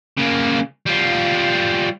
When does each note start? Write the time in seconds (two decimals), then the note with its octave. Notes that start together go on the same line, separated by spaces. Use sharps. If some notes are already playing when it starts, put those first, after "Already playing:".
0.18 C#3 A#3
0.86 G3 F4